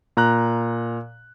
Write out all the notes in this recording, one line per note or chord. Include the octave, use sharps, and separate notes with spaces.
A#2 A#5 F#6